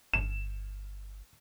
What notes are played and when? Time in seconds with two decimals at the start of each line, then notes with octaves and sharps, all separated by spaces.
0.14 G1 E7